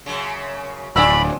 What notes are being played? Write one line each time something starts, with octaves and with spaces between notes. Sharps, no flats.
F#2 C#3
D1 F3 D4 D5 G#5 B5 E6